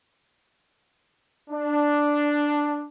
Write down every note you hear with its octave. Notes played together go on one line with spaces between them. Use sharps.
D4